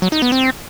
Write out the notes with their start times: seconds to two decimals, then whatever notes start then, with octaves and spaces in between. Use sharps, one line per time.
0.02 F#3
0.12 D#4
0.22 B3
0.32 C4